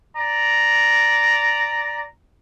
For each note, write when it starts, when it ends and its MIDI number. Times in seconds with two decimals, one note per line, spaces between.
0.16 2.04 74
0.16 2.04 82